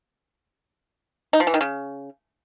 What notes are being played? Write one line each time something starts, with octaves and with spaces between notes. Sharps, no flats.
D#4
F3
E3
D#3
C#3